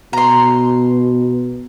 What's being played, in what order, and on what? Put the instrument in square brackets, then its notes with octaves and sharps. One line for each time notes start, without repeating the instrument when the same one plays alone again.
[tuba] B2 [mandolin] A#5 C6